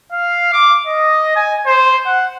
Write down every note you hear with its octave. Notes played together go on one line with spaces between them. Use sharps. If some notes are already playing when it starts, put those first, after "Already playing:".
F5
D6
D#5
G#5
C5
F#5